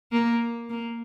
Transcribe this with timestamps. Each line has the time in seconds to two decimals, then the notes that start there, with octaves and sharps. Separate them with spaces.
0.12 A#3
0.70 A#3